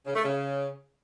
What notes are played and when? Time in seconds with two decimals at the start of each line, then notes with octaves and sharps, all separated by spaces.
0.06 C#3
0.15 A3
0.25 C#3